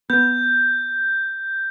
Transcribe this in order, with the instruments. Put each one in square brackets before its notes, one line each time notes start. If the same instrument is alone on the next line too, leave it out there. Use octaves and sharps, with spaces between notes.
[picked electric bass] B3 [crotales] G6